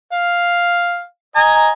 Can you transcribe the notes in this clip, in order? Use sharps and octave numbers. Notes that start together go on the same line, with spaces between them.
F5
D#5 G#5 A#5